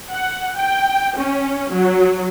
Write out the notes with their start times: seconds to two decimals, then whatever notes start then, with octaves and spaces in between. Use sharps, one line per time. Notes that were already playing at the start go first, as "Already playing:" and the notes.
0.11 F#5
0.56 G5
1.17 C#4
1.73 F#3